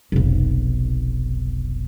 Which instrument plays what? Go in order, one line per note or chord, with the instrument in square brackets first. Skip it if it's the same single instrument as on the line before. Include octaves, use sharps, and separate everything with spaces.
[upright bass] F1 B1